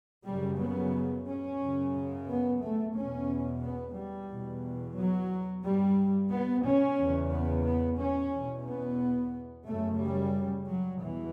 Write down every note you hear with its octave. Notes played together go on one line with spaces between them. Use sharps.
F#2 C#3 G3
B3
C#4
F#2 C#3
B3
A3
E2 B2 C#4
B3
G3
E2 B2
F#3
G2 G3
B3
C#4
E2 C#3
B3
B3
C#4
E2 B2
B3
F#2 C#3 A3
G3
F#3
E2 B2 E3